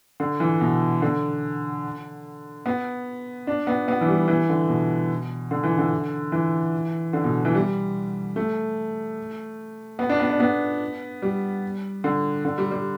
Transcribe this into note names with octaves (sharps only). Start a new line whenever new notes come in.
D3
E3
B2
D3
B3
D4
B3
B3
E3
G3
E3
D3
B2
D3
E3
D3
E3
D3
B2
E3
G3
A3
B3
D4
B3
D4
B3
G3
D3
D3
G3
G3